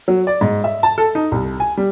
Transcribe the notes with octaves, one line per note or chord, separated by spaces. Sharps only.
F#3
D5
G#2
E5
A5
A4
D#4
C2
G#5
G3